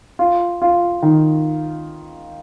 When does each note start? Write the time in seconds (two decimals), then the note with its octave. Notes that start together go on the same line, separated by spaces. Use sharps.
0.19 F4
0.62 F4
1.02 D#3